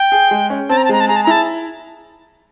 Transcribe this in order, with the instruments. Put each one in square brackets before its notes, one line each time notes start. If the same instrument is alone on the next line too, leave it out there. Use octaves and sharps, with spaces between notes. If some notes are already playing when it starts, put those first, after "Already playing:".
Already playing: [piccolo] G5
[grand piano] G#4
G#3
C#4
[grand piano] C4 [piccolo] A5
[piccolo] A#5
A5
[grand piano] G#3 [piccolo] A#5
[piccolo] A5
[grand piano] G#4 [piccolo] A#5
[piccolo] A5
A#5
[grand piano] E4 [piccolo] A5